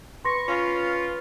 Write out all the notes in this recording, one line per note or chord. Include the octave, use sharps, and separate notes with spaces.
B4 C6 C#6 A#6
C#4 F4